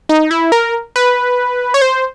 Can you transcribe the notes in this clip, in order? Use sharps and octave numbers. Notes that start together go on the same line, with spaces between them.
D#4
E4
A#4
B4
C#5
C5